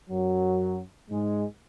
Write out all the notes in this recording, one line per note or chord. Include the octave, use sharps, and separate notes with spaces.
F#2 F#3
G#2 G#3